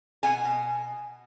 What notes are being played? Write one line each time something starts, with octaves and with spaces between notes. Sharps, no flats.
B2 F#5 G#5
B2